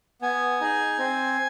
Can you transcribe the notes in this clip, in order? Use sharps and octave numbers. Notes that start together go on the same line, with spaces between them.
B3 G#5
D#4 G#4
C4